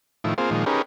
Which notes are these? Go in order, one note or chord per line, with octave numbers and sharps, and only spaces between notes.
A2 D#3 F3 E4
A#3 C4 F4 G#4 C5
A#2 D#3 F3 G#3
C#4 D#4 G4 G#4 A#4 B4